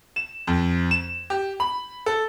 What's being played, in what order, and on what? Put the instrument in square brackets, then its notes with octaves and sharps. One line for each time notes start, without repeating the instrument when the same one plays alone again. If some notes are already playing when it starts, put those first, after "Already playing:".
[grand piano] E7
F2
E7
G4
B5
A4